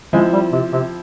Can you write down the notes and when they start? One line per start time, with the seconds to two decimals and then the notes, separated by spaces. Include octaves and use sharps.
0.13 F3 G#3 C4 E4
0.33 G3
0.52 C3
0.73 C3